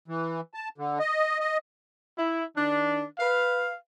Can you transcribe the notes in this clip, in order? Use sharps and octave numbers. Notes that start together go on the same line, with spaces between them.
E3
A5
D3
D#5
D#5
E4
D#3 D4
B4 F5